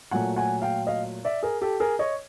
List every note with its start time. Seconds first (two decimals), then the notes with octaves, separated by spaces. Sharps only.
0.11 A#2 F#3 A3 F#5 G#5
0.36 F#5 G#5
0.62 F5 G5
0.87 D#5 F5
1.25 D5 E5
1.43 G#4 A#4
1.62 G4 A4
1.80 G#4 A#4
1.99 C#5 D#5